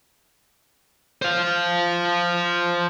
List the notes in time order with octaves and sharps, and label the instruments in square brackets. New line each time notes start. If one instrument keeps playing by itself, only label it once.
[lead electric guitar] C5 F5